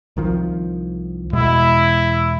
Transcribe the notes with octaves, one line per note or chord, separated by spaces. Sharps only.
C2 D#3 F3
E2 B2 G#3 E4